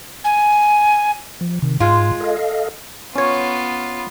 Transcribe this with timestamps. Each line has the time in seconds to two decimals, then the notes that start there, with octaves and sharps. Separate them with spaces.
0.25 G#5
1.41 F3
1.62 C3 D#3
1.80 G#2 G#3 F4
2.20 A4 D#5 F5
3.16 B3 C#4 F4 C#5